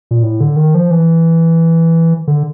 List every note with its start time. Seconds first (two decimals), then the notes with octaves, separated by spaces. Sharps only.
0.11 A#2
0.23 A2
0.40 D3
0.56 D#3
0.75 F3
0.91 E3
2.27 D3